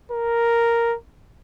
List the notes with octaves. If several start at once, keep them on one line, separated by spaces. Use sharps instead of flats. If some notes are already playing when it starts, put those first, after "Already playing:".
A#4